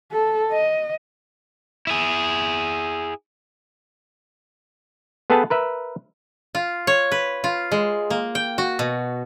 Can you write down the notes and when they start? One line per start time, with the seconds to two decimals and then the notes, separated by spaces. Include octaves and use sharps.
0.12 A4
0.52 D#5
1.87 E4 G#4
5.30 B3 G#4 A4 B4 G5 A5
5.50 A#4 B4 E5
6.55 F4
6.87 C#5
7.12 B4
7.44 F4
7.72 G#3
8.10 A#3
8.35 G5
8.58 F#4
8.79 B2